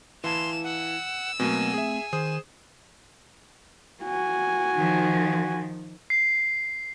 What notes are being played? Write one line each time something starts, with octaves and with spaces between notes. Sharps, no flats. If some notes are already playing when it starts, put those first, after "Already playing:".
E3 E4 F5 A5 C6 F6 E7
F#5 E6
B2 F#3 A3 A#3 C4 G#5
G#4 E5
D#3 G#4 C5 D#6 E7
F#4 G#5
D#3 F3
C7